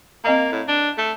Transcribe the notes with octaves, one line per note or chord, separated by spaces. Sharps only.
A#3 C4 D#5 A#5
A2
D4
A3